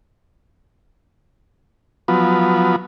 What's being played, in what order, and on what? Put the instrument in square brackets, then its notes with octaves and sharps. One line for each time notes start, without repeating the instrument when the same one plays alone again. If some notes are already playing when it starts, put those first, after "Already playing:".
[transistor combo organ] F3 F#3 B3